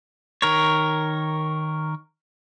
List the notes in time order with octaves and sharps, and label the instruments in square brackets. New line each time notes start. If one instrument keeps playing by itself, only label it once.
[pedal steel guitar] D#3 A#4 C#5